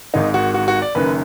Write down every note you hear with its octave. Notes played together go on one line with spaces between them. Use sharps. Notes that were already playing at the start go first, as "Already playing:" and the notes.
G#1 G#2 D#3 D#4
F#4
F#4
F#4
D5
F#1 F#2 D#3 B4